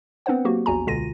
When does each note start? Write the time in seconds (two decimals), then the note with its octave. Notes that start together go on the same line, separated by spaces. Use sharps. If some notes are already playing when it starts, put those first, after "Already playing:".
0.26 B3 C4 D4 B4 C5 F#5
0.45 F#3 A#3 F#4 G4
0.66 A#1 E2 F#4 G#5 A#5
0.87 C#2 B2 D3 F4 A#6 D#7